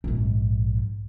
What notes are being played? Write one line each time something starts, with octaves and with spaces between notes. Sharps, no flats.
A#1 G#2